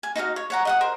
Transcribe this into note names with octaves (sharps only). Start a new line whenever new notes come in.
G#5
D#4 F#4 D#5 F5
C#5
C#5 F#5 A#5
D#5 F#5 D#6
A#4 C5